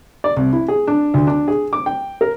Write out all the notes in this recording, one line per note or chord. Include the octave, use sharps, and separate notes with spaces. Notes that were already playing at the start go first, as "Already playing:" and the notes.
D5
C2
E4
G#4
D4
D2
D4
G#4
D6
G5
A#4